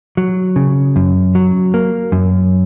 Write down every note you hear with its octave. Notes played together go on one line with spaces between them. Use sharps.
F#3
C#3
F#2
F#3
A#3
F#2